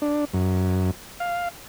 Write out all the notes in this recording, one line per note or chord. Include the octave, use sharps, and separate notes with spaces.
D4
F#2
F5